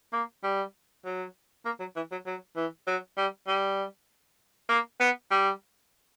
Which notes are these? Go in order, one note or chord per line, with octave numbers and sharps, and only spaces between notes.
A#3
G3
F#3
A#3
F#3
E3
F#3
F#3
E3
F#3
G3
G3
A#3
B3
G3